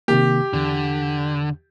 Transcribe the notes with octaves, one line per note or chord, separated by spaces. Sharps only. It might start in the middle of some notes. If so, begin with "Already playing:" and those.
C3 D#3 A#3 G4
E2 D3